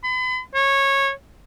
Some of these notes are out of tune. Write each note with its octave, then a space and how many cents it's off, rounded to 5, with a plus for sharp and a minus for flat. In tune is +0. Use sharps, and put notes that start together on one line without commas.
B5 +40
C#5 -15